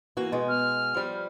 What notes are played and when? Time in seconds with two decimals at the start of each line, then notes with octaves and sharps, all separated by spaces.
0.17 E3 A#3 F#4
0.32 B2 G#3
0.49 F6
0.94 F3 G3